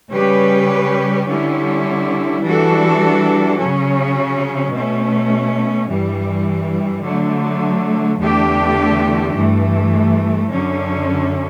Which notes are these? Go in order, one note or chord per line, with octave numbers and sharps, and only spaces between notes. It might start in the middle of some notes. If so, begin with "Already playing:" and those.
C#3 G3 C#4 G4 B4
D3 G3 C#4 E4
E3 G3 D4 F#4 A4
C#3 F#3 C#4
B2 A3 C#4
G2 E3 G3
D3 F#3 A3
E2 D3 A3 D4 G4
G2 E3 A3
F#2 D3 F#3 C#4